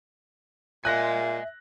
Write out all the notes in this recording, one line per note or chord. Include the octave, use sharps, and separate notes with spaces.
A#2 D#5 E5 G#5 F#6 A#6